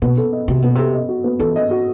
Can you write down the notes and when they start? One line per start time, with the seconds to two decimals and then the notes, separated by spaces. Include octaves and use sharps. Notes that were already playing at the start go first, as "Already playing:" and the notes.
0.02 B2 B3
0.17 A4
0.33 D#5
0.48 C3 F#4
0.62 B2 B3
0.75 C3 A4
0.93 D#5
1.09 F#4
1.24 B3
1.39 E3 A4
1.56 D#5
1.71 F#4